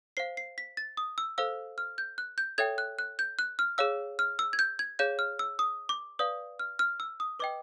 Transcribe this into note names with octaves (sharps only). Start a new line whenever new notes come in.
C5 F5 C7
C7
B6
A6
D#6
E6
A4 C5 F5 E6
F6
G6
F#6
G6
A4 C#5 E5 G5 G#6
F#6
F#6
G6
F#6
F6
G#4 C#5 F5 E6
F6
E6
G#6
G6
G#6
G#4 C#5 F5 G6
F6
E6
D#6
D6
B4 D5 F5 D#6
F6
F6
E6
D#6
B4 D#5 G5 D6